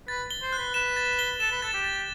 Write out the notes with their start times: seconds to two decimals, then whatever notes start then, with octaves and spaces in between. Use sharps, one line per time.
0.08 B4 A6
0.31 G7
0.42 C5
0.53 F#6
0.58 B4
0.74 B4 E7
0.97 A6
1.19 G7
1.40 A4 E7
1.52 B4
1.62 A4 A6
1.74 G4
1.84 A6